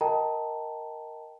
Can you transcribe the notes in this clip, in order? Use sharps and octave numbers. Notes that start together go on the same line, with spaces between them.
A#4 D#5 G5 A5 A#5